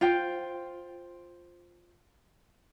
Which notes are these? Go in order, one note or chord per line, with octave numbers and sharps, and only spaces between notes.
F4 C5 G5